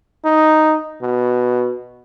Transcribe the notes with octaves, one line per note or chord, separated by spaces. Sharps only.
D#4
B2